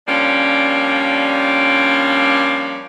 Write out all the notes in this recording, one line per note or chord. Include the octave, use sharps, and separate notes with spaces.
F3 G3 A#3 C#4 D4